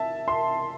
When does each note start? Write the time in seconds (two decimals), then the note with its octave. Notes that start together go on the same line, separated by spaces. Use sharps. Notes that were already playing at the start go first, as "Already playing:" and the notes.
Already playing: E5 A5
0.28 C6